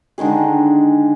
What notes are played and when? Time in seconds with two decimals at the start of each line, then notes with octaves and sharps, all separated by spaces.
0.18 D3 D#3 G#3 G#4